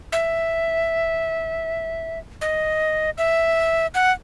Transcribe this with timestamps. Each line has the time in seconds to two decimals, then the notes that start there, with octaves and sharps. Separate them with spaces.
0.12 E5
2.41 D#5
3.18 E5
3.95 F#5